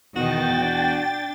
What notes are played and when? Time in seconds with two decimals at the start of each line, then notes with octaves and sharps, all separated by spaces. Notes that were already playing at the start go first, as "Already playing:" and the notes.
0.16 E2 B2 D#3 F#4 D#5 G5 A6
0.61 D4